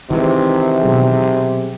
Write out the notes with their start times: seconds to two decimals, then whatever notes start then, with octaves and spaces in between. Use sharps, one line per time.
0.11 C3 D#3 E3 G#3
0.81 B2 F#3 G#4